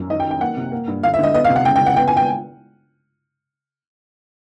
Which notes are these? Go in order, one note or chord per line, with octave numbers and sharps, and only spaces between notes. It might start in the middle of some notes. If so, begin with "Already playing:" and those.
Already playing: F#2
D#3 D#5
G5
D#3
G5
A#3 F#5
C3
A#3
G2
D3 F5
E5
D3 D#5
B3 D#5
F5
C3
F#5
C#3 G5
G5
C#3
F#5
B3 G5
G#5
G5